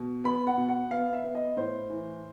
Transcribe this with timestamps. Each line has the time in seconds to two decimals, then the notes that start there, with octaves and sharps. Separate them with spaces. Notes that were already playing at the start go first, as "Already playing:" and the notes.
Already playing: B2
0.24 B3 B5
0.47 F#5
0.58 B2
0.69 F#5
0.91 B3 F5
1.13 E5
1.24 B3
1.35 D#5
1.57 A2 C5
1.90 E3